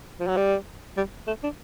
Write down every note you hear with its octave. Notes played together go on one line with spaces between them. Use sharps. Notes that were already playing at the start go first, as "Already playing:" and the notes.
F3
F#3
G3
G3
A3
D4